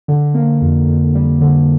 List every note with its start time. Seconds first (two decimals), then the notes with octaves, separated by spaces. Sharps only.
0.08 D3
0.34 A#3
0.61 F2
0.87 F2
1.15 G3
1.41 D3